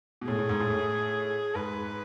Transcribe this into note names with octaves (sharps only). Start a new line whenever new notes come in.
B2
A2 G#4
A2
G#2
A2
A2
G#2 B4